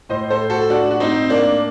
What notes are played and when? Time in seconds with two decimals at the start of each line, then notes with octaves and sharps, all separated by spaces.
0.09 A2 C5 D#5
0.30 A4 C5
0.50 F#4 A4
0.70 D4 F#4
0.91 F#4
1.00 C4 D#4
1.30 A#3 D4